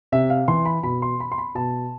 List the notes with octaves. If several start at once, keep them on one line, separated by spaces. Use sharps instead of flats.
C3 E5
F5
E3 C6
B5
B2 B5
C6
B5
C6
B5
B2 A5